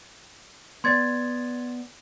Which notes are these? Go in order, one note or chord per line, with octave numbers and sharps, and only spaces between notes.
B3 D5 C6 G#6 A6